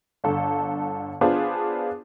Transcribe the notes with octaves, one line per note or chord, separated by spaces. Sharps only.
G1 D3 A4
B3 D4 F4 G#4 C5